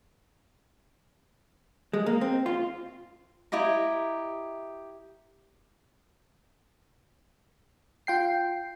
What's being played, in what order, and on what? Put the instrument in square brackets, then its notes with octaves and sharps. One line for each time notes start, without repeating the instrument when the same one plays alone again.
[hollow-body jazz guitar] G#3
A#3
C4
F4
[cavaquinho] E4 G4 D#5 A#5
[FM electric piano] F4 G5 C7